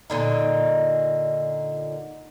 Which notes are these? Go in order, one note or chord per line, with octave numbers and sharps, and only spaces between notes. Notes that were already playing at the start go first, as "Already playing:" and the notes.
A#2 D3 D#4